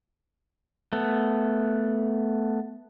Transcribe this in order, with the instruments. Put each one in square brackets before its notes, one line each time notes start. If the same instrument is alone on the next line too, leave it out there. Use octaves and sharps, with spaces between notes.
[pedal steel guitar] A3 B3